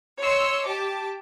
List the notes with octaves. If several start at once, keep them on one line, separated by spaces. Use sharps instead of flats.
C#5 D#5 C6 E6 C#7
G4 A5 D6